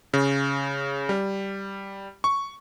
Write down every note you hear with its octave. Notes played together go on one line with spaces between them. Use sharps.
C#3
G3
C#6